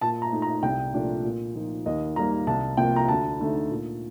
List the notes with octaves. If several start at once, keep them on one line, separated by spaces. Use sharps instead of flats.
A#2 A5
A#5
A3 D#4
A#5
C2 G5
A#2 F3 A3 D4
A#2
F3 A#3 D#4
D#2 D#5
D#3 G3 A#3 A#5
C2 A5
C3 F3 A#3 G5
A#5
D2 A5
D3 A3 D#4
A#2